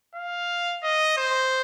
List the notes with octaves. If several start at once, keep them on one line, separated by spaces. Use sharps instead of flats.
F5
D#5
C5